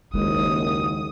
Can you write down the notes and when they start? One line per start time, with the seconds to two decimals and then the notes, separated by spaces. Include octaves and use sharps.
0.14 F#1 D#2 G#3 D#6